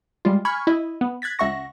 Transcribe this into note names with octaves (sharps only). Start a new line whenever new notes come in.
G3 G#3 F4
G#5 B5 C#6 F6 G#6
E4 D#5
B3
F#6 G#6 A6 B6
C#2 E5 F#5 C#6 A#6